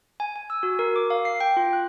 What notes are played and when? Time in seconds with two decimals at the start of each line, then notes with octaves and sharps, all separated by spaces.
0.20 G#5
0.36 G#5
0.50 E6
0.63 F#4
0.79 A#4
0.96 D6
1.10 F5
1.25 C7
1.40 G5
1.57 F4
1.73 F#6